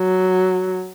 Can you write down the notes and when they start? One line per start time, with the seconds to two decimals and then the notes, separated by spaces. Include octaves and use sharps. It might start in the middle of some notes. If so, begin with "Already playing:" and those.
Already playing: F#3